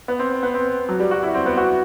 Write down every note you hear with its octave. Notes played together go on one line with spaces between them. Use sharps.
B3
C4
B3
C4
F#3
G3
F#4
E4
C4
B3
F#4